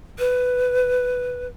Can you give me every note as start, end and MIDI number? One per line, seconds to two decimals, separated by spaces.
0.19 1.47 71